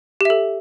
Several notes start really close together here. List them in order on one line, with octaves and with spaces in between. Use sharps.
G4 E5 A4